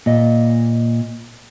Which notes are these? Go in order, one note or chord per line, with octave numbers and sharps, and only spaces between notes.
A#2 D#5